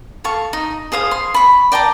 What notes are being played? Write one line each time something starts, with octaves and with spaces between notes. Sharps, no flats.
A4 F5 C#6
D#4
G#4 C5 F5 D#6
C6
B5 C#6
D5 G5 A5 A#5